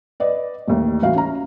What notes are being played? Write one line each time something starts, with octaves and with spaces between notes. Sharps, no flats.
B4 D5 D#5
A1 D#2 A2
A1 E3 F#4 F5
C#4 A#5